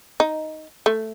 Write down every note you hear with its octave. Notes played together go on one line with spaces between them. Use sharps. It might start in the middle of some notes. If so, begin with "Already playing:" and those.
D#4
A3